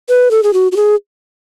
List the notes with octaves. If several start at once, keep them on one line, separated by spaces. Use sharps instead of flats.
B4
A4
G#4
F#4
F#4
G#4